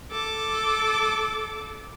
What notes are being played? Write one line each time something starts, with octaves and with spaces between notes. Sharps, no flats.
A4 D6